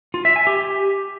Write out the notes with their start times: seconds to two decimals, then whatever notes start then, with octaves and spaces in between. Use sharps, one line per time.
0.14 F4
0.25 E5
0.36 G#5
0.47 G4